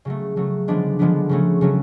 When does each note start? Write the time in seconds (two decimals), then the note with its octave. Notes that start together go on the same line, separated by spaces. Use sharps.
0.05 C#3 F#3 A3
0.36 C#3 F#3 A3
0.68 D3 F3 G#3 B3 D4
0.99 D3 F3 G#3 B3 D4
1.29 C#3 F#3 A3 C#4
1.61 C#3 F#3 A3 C#4